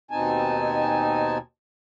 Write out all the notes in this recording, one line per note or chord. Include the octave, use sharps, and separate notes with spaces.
D#2 B2 C4 D#4 G#5 A5